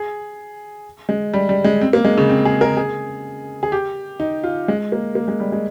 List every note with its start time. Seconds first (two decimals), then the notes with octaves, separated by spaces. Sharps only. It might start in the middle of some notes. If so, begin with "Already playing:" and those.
Already playing: G#4
1.09 G#3
1.34 G3
1.49 G3
1.65 G#3
1.81 C4
1.93 A#3
2.05 G#3
2.18 C#3
2.29 C4
2.45 G#4
2.61 A#4
2.77 G#4
3.63 G#4
3.72 G4
4.20 D#4
4.44 F4
4.68 G#3
4.92 A#3
5.15 A#3
5.28 G#3
5.40 G3
5.52 G#3